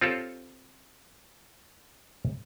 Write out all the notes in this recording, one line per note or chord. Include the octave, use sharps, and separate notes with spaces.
C4 F4 G4 A4 C#5